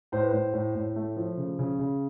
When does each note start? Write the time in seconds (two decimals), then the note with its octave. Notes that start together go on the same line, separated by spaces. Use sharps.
0.12 A2 C5
0.21 B4
0.31 A2 C5
0.53 A2
0.75 A2
0.96 A3
1.16 F3
1.37 C#3
1.59 C#3
1.79 C#3